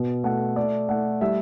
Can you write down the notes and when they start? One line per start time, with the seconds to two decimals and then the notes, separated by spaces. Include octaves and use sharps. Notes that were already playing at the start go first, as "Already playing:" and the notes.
Already playing: B2
0.24 A3 F#5
0.56 A3 D5
0.89 A3 F#5
1.21 G3 E5